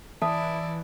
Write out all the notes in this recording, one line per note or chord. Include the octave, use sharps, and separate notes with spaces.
E3 E4 D5 E5 A5 D#6